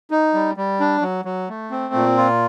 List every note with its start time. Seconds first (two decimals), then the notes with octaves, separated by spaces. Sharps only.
0.11 D#4
0.34 G3
0.57 G3
0.80 D4
1.02 F#3
1.25 F#3
1.49 A3
1.71 C4
1.94 A#2
2.17 F4